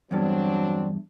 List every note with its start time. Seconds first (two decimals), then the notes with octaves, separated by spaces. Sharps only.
0.11 E2 G2 F#3 C4 D4 A4